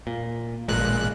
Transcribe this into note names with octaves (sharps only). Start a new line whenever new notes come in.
A#2
A1 A#2 G#3 F#6